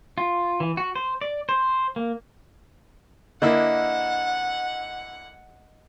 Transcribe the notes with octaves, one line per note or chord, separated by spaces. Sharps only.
F4
E3
F#4
C5
D5
C5
A#3
D3 A#3 E4 D#5 F#5